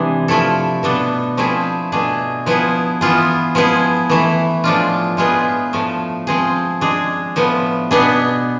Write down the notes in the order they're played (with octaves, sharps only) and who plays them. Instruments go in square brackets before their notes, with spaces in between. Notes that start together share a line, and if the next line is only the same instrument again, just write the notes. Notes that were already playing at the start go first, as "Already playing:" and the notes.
Already playing: [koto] C3 E3 G#3 D4 G#4
F3 A3 E4 A4
B2 B3 D4 A4
F3 A3 C4 E4 G#4
B2 A3 D4 G#4
F3 B3 E4 G#4
E3 B3 F4 G#4
F3 G#3 B3 E4 G#4
E3 A3 E4
A2 F3 G#3 D4 F4
A2 G#3 B3 F4 G#4
A2 F3 A3
F3 G#3 C4 G#4
G#3 D4 G#4
A2 F3 B3
B2 B3 D4 G#4